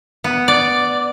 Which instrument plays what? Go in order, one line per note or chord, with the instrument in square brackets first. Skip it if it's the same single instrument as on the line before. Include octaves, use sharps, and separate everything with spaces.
[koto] B3
D5